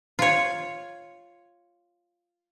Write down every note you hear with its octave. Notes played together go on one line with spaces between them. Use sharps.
F4 C#5